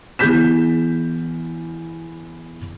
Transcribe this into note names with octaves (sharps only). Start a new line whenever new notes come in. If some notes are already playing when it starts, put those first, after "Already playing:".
E3 B3 G#4 G6 B6 E7